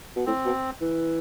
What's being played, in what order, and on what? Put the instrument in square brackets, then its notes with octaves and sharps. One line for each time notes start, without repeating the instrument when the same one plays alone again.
[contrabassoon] B2
[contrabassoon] A2 [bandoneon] C4
[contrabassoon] B2
E3